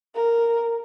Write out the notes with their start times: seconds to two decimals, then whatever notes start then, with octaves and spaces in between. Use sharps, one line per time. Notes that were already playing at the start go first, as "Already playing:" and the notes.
0.15 A#4